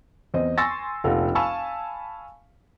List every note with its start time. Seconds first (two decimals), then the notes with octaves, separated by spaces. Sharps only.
0.34 E2 C4 D#5
0.58 G#5 C6 C#6 E6 A6 A#6
1.04 F1 A#1 F4 A4 F5 F#5
1.35 F5 G#5 A5 B5 C#6 E6